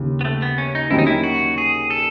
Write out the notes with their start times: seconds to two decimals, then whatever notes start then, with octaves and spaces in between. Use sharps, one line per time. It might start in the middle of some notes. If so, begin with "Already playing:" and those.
Already playing: D#2 C#3
0.21 B3
0.25 A3
0.42 B3
0.58 C#4
0.75 D#4
0.91 D#2 D#3 F#3 C#4 E4
0.99 D#4
1.07 E4
1.24 F#4
1.58 G#4
1.90 A4